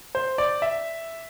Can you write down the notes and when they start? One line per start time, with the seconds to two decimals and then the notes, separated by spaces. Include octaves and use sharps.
0.15 C5
0.38 D5
0.62 E5